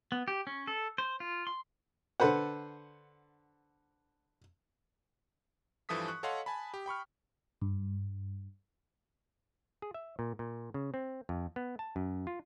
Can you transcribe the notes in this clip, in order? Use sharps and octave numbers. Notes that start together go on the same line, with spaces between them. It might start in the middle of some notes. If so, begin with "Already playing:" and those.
B3
G4
C#4
A4
C5
F4
C6
D3 A4 B4 C5 F#5
G2 E3 F3 A4 D#6 B6
C#6 F#6
A4 C#5 D#5 F5 F#5 C6
G#5 A5 B5
G4
G5 B5 C#6 F6
G2
G#4
E5
A#2
A#2
C#3
C4
F2
B3
A5
F#2
F4